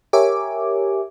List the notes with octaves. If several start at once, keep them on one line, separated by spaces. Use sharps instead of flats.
G4 A#4 C#5 E5 G#5 D6